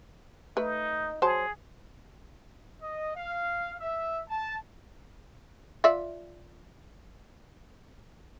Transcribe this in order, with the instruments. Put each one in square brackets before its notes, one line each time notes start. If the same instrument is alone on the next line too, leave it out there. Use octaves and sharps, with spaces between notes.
[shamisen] A3 B4 [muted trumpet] D#4
[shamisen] F#3 C5 A5 [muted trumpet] G#4
[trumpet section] D#5
F5
E5
A5
[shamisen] F4 D5 E5